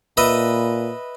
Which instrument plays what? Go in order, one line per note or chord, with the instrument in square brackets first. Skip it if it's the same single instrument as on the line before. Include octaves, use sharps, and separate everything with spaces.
[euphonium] A#2 [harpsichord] B4 D#5 E5